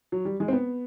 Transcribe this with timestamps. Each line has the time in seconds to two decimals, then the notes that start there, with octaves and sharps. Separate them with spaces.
0.12 F#3
0.25 G3
0.40 G#3
0.48 C4
0.53 B3